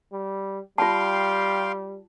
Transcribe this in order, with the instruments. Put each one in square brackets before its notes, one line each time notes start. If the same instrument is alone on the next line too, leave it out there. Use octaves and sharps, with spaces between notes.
[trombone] G3
[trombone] G3 [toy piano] F4 A5 [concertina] F5 G5 C6